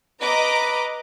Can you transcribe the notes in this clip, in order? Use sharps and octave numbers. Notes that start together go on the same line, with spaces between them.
B4 D#5 A#5 D6